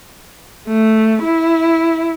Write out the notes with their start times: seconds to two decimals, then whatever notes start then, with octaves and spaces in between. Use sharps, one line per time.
0.68 A3
1.23 E4